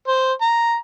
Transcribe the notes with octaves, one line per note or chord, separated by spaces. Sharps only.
C5
A#5